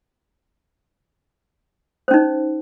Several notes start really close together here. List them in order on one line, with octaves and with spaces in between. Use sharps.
C5 C#4 D#4